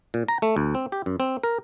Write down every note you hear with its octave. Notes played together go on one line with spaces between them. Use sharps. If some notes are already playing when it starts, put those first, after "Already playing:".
A#2
A#5
A3
D2
C4
G4
F#2
C4
A#4